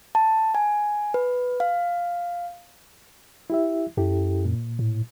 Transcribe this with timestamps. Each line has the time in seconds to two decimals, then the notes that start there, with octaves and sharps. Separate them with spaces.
0.15 A5
0.55 G#5
1.14 B4
1.60 F5
3.50 E4 G4 E5
3.97 F#2 E4 G4 A4
4.45 A#2
4.79 A2